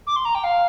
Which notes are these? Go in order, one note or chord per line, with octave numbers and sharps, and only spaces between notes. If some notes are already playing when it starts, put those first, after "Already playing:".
D6
C6
A#5
G5
F5